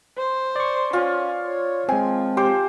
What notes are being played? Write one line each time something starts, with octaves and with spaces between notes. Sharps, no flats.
C5
D5 C#6
C#4 F4
C#5
F3 G#3 C4 G#5
G4 C5 G5 D6